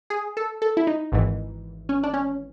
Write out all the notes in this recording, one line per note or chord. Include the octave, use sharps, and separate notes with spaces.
G#4
A4
A4
E4
D#4
G#1 G#2 E3
C#4
D4
C#4